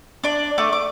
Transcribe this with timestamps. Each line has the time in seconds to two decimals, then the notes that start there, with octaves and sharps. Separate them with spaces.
0.24 D4 D5
0.58 A3 D6
0.73 D6